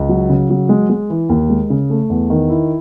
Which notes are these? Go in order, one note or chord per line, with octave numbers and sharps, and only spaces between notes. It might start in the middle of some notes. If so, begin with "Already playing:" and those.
Already playing: C#2
F#3
C#3
F#3
G#3
G#3
E3
D#2
G#3
C#3
A3
E2
D#3
E4